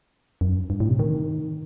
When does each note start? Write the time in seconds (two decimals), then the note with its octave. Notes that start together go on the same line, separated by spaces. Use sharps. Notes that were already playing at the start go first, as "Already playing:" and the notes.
0.41 F#2
0.70 G2
0.80 A2
0.89 C3
0.99 D#3